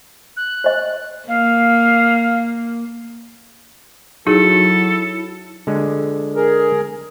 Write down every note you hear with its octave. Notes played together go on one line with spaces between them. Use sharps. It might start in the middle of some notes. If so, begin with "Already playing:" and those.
F#6
C5 D#5
A#3 F5
F#3 D#4 E4 F#4 G#4 A4
D3 G#3
G#4 A#4